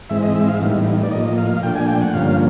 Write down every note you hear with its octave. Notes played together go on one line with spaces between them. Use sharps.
G#2 E3 G#3 C4 E5
D#5
E5
F5
A2 E3 G3 B3 D#4
D5
A2 F3 A#3 D#5
F5
A#2 F3 A3 D4 G5
G#5
G5
F#5
G2 D3 F3 A#3 C#4 F5